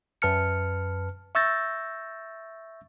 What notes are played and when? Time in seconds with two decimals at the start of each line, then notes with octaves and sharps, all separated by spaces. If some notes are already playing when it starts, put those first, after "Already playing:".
0.22 F#2 B4 A5 F6 C#7
1.35 E5 C#6 E6 G6 A6 A#6